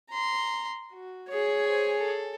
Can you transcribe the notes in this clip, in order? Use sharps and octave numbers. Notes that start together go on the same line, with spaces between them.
A#5 C6
F#4
G#4 C#5
C5 G#5
A4